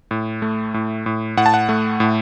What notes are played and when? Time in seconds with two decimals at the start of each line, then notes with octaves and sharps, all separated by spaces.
0.11 A2
0.42 A3
0.74 A2
1.06 A2
1.37 A2 F#5
1.46 A5
1.54 F#5
1.69 A3
2.00 A2